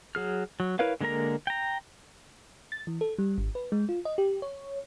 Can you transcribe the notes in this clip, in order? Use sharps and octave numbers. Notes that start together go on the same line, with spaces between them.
F#3 G#4 F6
F#3
E4 A#4 B4 C#5 F5
D3 G#3 A#3 A#4 A#5
G5 A#5
A6
E3
A4
G3
G#1
B4
G#3
F4
D#5
G4
C#5